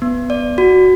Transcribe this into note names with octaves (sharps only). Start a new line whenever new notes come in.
B3
D5
F#4